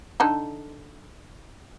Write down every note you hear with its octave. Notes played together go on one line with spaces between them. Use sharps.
D3 D#4 A4